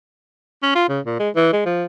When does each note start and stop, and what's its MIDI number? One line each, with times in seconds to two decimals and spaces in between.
0.63 0.75 61
0.75 0.86 65
0.89 1.00 49
1.05 1.18 46
1.20 1.29 56
1.36 1.53 52
1.53 1.61 56
1.65 1.85 53